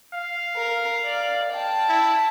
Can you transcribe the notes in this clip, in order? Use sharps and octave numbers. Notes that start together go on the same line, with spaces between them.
F5
A#4
D5
G5 A5
E4